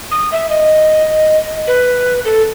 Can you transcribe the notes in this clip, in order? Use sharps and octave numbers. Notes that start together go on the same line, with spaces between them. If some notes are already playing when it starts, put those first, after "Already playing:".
D#6
E5
D#5
B4
A4